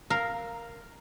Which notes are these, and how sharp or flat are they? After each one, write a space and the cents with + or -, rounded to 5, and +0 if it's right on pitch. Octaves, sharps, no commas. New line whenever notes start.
A#4 +0 F5 +0